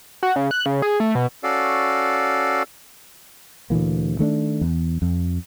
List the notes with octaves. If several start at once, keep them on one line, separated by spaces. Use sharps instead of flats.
F#4
C#3
F#6
C#3
G#4
A3
B2
C#4 F#4 A4 D5 F5
D2 A#2 E3 A#3
D#3 A3 C#4 D4
E2
F2